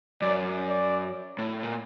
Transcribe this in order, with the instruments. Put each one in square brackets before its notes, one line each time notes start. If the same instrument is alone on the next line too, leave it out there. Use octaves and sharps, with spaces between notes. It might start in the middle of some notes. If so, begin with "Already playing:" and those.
[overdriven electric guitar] F#2 [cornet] D5
[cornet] D5
[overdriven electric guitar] A2
A#2